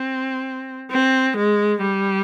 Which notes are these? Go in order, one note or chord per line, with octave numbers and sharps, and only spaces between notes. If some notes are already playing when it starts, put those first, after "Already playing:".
Already playing: C4
C4
G#3
G3